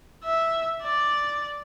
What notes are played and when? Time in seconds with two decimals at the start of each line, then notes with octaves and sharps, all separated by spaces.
0.24 E5
0.83 D5